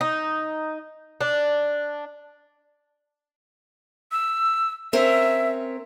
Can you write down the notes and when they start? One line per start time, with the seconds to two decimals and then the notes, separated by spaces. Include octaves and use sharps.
0.01 D#4
1.21 D4
4.12 E6
4.93 C4 C#4 A#4 E5